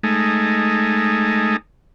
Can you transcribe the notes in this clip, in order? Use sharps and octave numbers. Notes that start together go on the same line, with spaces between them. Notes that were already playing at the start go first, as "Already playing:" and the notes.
G#3 A3 D#4